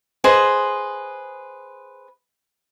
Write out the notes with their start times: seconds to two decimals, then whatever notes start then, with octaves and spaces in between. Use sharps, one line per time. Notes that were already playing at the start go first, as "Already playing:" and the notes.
0.24 G#4 B4 C5 D#5